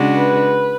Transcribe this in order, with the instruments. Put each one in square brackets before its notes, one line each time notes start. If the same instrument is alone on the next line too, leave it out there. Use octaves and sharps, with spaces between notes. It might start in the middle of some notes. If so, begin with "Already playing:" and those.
Already playing: [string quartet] C#3 G#3 D4 F#4
[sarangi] B4